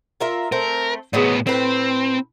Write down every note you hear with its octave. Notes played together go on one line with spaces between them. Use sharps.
F4 A#4 E5
A3 C4 A#4
A2 E3 F#3 G#3 B3
A2 C4 B4